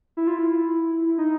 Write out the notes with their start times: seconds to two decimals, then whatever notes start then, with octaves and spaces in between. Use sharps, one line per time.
0.17 E4
0.27 F4
0.39 E4
1.18 D#4